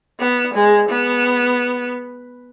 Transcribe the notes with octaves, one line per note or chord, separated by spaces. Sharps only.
B3
G#3
B3